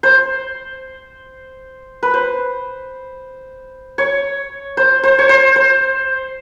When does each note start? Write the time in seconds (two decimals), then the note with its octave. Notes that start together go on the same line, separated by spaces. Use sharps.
0.03 C5
2.03 B4
2.14 C5
3.98 C#5
4.77 C5
5.03 C5
5.19 C#5
5.29 C5
5.56 C5